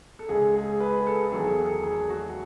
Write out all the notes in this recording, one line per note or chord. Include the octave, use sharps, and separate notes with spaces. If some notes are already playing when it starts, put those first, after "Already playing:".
A4
C#2 C#3 G#3 G#4
G#4
B4
G#4
A4
E2 D#3 F#3 G#4
A4
G#4
A4
G#4
F#4